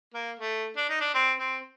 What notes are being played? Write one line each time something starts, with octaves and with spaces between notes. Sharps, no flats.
A#3
A3
D4
D#4
D4
C4
C4